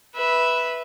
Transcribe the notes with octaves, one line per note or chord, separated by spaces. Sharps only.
B4 E5